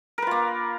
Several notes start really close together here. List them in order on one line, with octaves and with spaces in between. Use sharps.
A#4 B4 F4 A#3